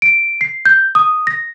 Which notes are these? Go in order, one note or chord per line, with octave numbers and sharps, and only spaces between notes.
D7
C7
G6
D#6
A#6